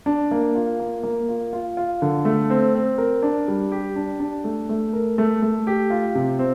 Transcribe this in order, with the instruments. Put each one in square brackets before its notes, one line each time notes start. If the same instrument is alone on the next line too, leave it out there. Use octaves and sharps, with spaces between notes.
[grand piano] D4
A#3
F4
A#3
A#3
F4
F4
F4
D3
A3
C4
C4
A#4
D4
G3
G4
D4
D4
A3
A3
A#4
A3
A3
G4
F4
C3
C4